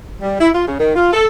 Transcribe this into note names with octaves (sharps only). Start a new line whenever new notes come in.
G3
E4
F4
C#3
D#3
F4
A4